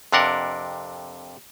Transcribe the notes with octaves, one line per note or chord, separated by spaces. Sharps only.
F2 C3 D4 A#4 F#5